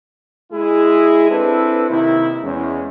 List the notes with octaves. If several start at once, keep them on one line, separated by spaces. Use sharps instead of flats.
G#3 E4 G#4
C4 D4 E4 A4 B4
C3 D#3 A#3 E4
E2 G#3 C#4